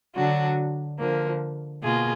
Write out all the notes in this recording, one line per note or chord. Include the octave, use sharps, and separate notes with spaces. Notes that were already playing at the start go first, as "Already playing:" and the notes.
D3 F#3 D4 F#4
D3 F3 A#3
B2 A#3 F4 G#4